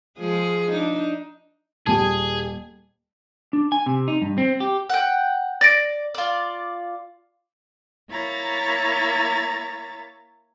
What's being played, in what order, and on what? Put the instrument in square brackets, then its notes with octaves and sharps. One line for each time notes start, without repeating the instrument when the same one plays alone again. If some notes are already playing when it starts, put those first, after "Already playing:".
[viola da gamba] F3 G#3 G#4
D4 D#4
[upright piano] D#1 G3 [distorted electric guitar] G#4 [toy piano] G#5 A5
[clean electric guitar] D4
G#5
C3
D#4
G2
C4
G4
[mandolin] F#5 G5
[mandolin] D5 [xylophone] A6 A#6 D7
[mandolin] F4 D5
[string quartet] A#3 E4 C#5 A#5 A6